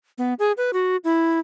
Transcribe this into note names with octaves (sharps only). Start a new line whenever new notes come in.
B3
G#4
B4
F#4
E4